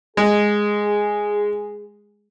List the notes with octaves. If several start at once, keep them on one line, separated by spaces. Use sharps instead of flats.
G#3 G#4